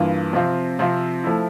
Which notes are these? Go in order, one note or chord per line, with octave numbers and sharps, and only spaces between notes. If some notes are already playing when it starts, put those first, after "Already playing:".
Already playing: G2 E3 A#3 F4
C3 F3 C4 F4
C3 F3 C4 F4
F3 A3 E4